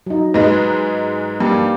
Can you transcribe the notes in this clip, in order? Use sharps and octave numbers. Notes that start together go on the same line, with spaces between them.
F#3 D#4
G#2 G#3 D#4 B4
G2 A#3 D4 G4